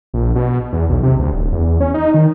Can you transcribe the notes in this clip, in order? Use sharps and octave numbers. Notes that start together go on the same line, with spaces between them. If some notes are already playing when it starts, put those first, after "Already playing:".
A#1
B2
E2
B1
C3
D2
D1
E2
C#4
D#4
D#3